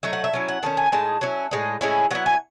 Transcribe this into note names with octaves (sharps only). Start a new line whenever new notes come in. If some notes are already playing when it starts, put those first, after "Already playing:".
F#3 A3 D#4 E5
F#5
E5
F#3 C#4 E4
F#5
D#3 A3 C#4 A5
G#5
A2 G#3 D#4 A5
F#3 C#4 E4
A2 G#3 D#4
A2 G#3 C#4 E4
F#3 B3 E4 F#5
G#5